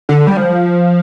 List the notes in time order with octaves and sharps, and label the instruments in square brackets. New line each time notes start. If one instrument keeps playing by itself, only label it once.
[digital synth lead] D3
G3
F3